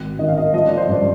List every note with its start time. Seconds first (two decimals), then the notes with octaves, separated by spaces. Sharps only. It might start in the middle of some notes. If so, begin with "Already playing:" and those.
Already playing: G#1 D#3
0.19 D#3 D#5
0.28 F5
0.38 D#5
0.54 F3 D#5
0.66 D5
0.77 C5
0.89 G2 D5